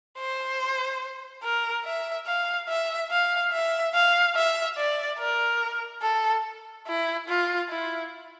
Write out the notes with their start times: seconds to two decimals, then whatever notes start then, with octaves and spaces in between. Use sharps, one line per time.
0.18 C5
1.43 A#4
1.85 E5
2.26 F5
2.69 E5
3.11 F5
3.53 E5
3.94 F5
4.35 E5
4.78 D5
5.19 A#4
6.02 A4
6.87 E4
7.28 F4
7.70 E4